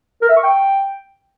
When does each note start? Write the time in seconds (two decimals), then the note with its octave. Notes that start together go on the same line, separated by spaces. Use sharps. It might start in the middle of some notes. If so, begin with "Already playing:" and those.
0.22 A#4
0.29 E5
0.36 C#6
0.43 G5